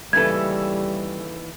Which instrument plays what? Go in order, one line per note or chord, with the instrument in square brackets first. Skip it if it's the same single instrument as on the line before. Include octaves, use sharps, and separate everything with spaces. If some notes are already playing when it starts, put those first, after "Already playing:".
[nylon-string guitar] D#2 E3 [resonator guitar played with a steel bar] C#3 A3 A4 [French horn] G3 [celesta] G#6